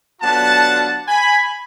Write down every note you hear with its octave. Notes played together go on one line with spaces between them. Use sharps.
D3 F#3 B3 D4 F4 F#5 A5
G#5 B5